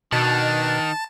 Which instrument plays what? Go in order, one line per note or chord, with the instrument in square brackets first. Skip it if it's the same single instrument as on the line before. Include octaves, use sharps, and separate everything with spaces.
[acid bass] B2 [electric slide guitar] D#3 [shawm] D4 [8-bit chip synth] A5